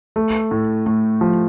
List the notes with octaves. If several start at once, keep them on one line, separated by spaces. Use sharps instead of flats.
A3
A2
A2
F3